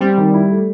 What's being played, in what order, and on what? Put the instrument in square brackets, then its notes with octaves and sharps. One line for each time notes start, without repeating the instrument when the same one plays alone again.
[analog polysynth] G3 [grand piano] C4
[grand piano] D#3
E4
A3